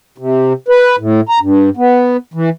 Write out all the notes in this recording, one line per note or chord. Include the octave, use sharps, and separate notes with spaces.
C3
B4
A2
A#5
G2
B3
E3